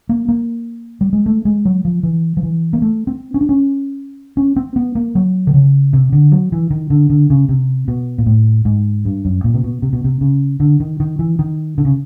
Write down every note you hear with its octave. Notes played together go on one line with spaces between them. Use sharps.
A#3
A#3
G3
G#3
A3
G#3
F#3
F3
E3
F3
E3
A#3
A3
C4
C#4
D4
C#4
C#4
C4
B3
A#3
F#3
D3
C#3
C3
D3
F#3
E3
D#3
D3
D3
C#3
C3
B2
A#2
A2
G#2
G2
F#2
A#2
C3
B2
C3
B2
C3
C#3
D3
D#3
D#3
E3
D#3
D3
C#3